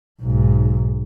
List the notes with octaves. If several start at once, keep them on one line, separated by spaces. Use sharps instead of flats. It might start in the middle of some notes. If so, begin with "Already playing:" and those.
B1 G#2